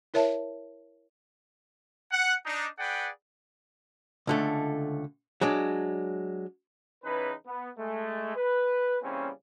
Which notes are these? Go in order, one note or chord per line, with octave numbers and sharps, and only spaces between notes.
E4 A#4 C#5 E5 A5
F#5
D4 D#4
G#4 B4 D5 F#5 G5
C#2 D3 A3
F#3 G#3 D4
E2 C#3 E3 C#4 D#4 B4
B3
G#3 A3
B4
C#3 E3 G3 A#3 C4 C#4